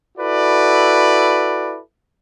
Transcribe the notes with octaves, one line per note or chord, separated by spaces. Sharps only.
E4 F#4 A4 B4 D5